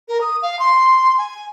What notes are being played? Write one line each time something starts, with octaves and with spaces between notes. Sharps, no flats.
A#4
D#6
F5
C6
G#5